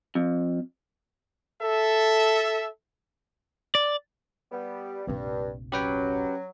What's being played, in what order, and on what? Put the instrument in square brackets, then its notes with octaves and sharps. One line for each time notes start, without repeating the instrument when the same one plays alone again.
[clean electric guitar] F2
[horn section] A4 E5
[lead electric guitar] D5
[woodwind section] G3 B3
[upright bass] F1 A#1 [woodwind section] G2
[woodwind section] F#3 [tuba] C#4 [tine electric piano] G4 B4 G5